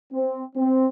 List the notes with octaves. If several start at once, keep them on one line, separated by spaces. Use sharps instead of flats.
C4
C4